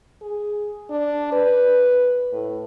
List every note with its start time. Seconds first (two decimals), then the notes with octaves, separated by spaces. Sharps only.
0.22 G#4
0.90 D4
1.32 B4
2.32 A2